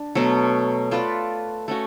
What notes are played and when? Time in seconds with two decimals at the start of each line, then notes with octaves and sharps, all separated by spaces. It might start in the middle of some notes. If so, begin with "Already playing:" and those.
Already playing: D4
0.15 B2 F#3 A3
0.91 A3 F4 B4 D5
1.68 A3 C#4 F#4